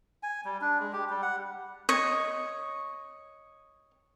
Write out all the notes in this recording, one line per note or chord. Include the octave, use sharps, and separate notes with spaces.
G#5
G3
D4
G#3
G4
G3
F#5
C#5 D#5